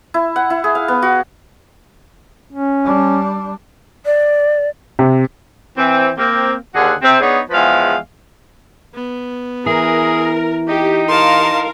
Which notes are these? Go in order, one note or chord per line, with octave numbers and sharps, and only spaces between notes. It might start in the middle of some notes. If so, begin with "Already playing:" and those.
E4
F#5
E4
G#4
F5
B3
F#4
C#4
G3 D4
D5
C3
E3 C4
A#3 C4
D#2 D3 G#4 F#5
C3 C4
B3 D4 D#4 G#4 C#5
E2 F3 G#3 B4 F5
B3
E3 G#4 A#4
D#4 G4
A#4 F5 A5 C6